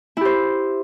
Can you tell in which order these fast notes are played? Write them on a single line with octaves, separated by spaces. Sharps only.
E4 G4 C5